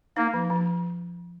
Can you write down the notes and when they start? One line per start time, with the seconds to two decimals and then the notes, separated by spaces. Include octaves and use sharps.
0.17 A#3 D#4
0.34 F3
0.50 F3